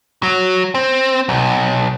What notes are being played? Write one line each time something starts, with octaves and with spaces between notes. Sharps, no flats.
F#3
C4
B1